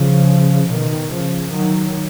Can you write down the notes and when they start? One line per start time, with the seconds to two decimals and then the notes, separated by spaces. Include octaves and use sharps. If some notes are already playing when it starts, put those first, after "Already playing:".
Already playing: C#3 F3
0.70 B2 D#3
1.11 C#3 F3
1.53 D#3 F#3